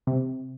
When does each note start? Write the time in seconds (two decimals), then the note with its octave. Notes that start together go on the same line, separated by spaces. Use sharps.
0.07 C3